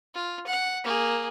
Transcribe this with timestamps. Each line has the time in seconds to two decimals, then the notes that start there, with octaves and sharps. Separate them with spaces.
0.14 F4
0.46 F#5
0.84 A#3 G#4